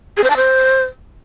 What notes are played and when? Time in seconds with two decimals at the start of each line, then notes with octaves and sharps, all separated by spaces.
0.17 G#4
0.24 C5
0.30 A5
0.37 C5